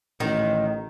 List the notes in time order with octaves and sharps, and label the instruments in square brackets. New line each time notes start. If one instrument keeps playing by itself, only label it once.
[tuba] A1 [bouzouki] D#3